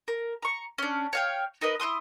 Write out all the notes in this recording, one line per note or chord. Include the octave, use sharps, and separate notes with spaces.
A#4
A#5 C#6
C#4 D4
C#5 F5 G5
D#4 A#4 B4 D#5
E4 F#4 C6 D#6